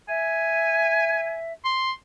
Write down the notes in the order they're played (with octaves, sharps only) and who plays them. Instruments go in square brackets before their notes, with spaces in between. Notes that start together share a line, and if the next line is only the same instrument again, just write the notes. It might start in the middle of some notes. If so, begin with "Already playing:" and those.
[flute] E5 [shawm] G#5
[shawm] C6